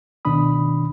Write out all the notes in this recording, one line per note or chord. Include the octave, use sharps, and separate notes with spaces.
C#2 B2 D#3 D4 B5 D#6